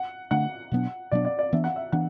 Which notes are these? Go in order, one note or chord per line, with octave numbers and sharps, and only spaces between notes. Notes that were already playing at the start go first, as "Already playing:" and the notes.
Already playing: F#5
D3 A3 D4 F#5
B2 F#3 B3 D4
B2 F#3 B3 D4 D5
D5
D5
E3 B3 D4 E5
F#5
E5
E3 B3 D4 F#5